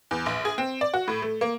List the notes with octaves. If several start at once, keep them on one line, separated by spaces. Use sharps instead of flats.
E2
A#1
G#4
C4
D5
F#4
A2
A3
A#3